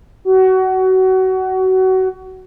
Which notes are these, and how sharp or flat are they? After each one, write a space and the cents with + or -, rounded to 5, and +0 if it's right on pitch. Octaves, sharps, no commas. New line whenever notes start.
F#4 +25